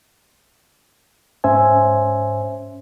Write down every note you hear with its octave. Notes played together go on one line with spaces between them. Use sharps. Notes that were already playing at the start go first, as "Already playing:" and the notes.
G#2 C#4 C5 E5 G#5